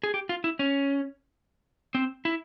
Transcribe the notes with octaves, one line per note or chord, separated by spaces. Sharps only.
G#4
G4
F4
E4
C#4
C4
E4